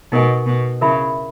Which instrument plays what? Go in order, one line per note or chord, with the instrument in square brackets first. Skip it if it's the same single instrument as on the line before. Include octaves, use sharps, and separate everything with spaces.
[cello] B2 [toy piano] D#4 A#4 D#5 G#5
[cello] B2
[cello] C#3 [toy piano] E4 A#4 E5 B5